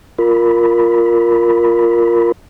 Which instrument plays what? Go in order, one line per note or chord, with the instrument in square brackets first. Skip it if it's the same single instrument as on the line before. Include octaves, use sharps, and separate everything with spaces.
[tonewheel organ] F4 A#4 B5